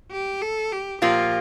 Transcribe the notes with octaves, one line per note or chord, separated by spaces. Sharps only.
G4
A4
G4
A#2 F3 A#3 F4 G4